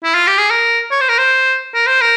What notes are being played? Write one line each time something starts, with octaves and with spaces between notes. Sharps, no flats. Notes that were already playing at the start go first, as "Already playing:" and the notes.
E4
F4
G4
G#4
A#4
C#5
C5
A#4
C5
A#4
C5
A#4